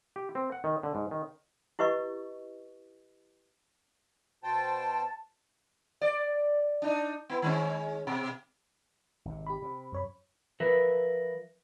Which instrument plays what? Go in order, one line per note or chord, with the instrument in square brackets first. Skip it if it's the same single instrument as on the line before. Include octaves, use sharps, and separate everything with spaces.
[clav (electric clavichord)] G4
C4
F#5
D#3
D3
G#2
D#3
[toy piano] E4 G4 B4 D#5 C#6
[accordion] B2 C5 G5 [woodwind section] A5
[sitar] D5
D4 D#4
B3 E4
D#3 G#3 C#4
B2
[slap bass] G#1 C3
[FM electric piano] G4 B5
[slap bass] C3
[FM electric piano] F#2 C#5 B5
[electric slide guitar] F3 A#4 B4 E5